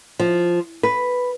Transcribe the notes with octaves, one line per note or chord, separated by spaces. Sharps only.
F3
B4